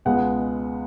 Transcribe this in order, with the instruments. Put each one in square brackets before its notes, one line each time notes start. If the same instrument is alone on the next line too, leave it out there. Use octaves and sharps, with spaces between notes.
[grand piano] C#2 B2 G#3 B3 F#5